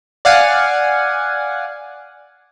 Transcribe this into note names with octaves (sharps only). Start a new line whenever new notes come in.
D5 F5 F#5 G#5